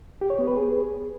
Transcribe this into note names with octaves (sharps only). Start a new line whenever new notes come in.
G4
C#5
B3
B4
G#4